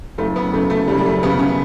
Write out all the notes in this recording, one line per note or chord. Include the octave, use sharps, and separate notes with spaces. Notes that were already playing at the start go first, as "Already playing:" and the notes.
F#1 A3
B3
F#2 C#3 A3
A3
F#1 G3
G3
A3
F#2 C#3 B3
C#4